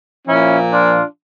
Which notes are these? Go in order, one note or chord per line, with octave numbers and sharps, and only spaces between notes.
A#2 F3 C#4 E4
D4 F4